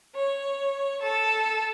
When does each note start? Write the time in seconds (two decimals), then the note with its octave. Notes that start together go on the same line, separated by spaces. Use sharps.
0.15 C#5
1.01 A4